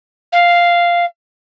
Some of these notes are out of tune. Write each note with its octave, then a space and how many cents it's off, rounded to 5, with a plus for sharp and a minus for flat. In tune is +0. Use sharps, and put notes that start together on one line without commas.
F5 -5